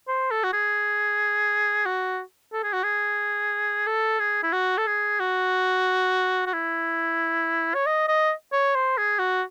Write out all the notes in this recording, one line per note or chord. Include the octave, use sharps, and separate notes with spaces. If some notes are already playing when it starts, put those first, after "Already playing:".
C5
A4
F#4
G#4
F#4
A4
G#4
F#4
G#4
A4
G#4
E4
F#4
A4
G#4
F#4
F#4
E4
C#5
D#5
D#5
C#5
C5
G#4
F#4